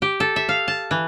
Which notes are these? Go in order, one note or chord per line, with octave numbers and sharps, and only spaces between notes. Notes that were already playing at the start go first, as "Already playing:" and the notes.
G4
A4
E5
F5
A5
E3